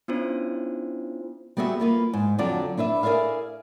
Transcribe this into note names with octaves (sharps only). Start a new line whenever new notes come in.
B3 C#4 D4 E4 F4 C5
G3 B3 F#4 G#4 E5
A#3 F4 B4
G#2
F2 D3 F#3 F4 D5
D4 E4 B4 E5
G#4 A#4 D5 E5 F5